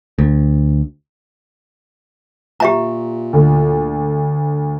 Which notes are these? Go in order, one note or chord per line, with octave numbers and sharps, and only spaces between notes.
D2
A#2 G4 E5 A#5
D2